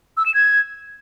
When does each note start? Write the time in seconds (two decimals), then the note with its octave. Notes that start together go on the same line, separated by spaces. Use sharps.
0.17 E6
0.26 E7
0.34 G#6